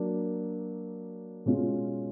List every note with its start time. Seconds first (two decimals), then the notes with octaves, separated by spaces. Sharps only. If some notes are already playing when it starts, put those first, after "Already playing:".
Already playing: F#3 A#3 D4
1.46 B2 G#3 C#4 F4